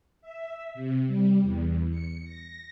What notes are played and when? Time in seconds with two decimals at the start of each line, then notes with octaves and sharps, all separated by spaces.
0.21 E5
0.74 C3
1.07 G3
1.43 E2
1.90 C#7
2.24 A#6